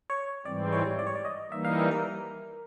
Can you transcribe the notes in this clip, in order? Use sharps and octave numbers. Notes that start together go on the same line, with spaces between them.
C#5
G#2 E3 G3 C4 D5
C#5
D5
C#5
D5
D#5
E3 G3 A#3 D#4 E5
F5
E5
A#4